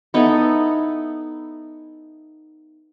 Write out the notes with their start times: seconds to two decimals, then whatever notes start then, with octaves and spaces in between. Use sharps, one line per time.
0.14 B3 D#4 E4 A4